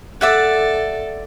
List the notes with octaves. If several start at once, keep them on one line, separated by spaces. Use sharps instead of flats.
A4 D5 E5 F#5